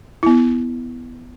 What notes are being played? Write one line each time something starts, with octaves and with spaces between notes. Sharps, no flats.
B3 E4